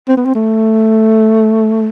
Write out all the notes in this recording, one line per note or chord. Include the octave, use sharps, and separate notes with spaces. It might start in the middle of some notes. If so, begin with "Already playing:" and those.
C4
B3
C4
A3